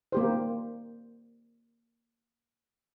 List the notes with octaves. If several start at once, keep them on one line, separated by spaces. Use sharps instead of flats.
A#3 G4 C5